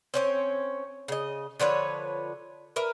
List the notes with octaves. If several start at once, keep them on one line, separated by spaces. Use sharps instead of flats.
C4 C#4 C#5
C#3 D#5
D3 F3 B4 C#5
A#4 B4 E5